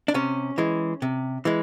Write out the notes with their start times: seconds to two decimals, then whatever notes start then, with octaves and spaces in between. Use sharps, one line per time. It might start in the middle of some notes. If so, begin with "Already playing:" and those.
0.08 D4
0.14 C3 C#4
0.58 E3 G#3
1.02 C3
1.45 E3 G#3